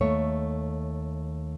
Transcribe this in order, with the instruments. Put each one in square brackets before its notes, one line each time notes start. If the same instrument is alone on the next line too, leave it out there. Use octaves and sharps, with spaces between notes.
[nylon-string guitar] D#2 A3 C#5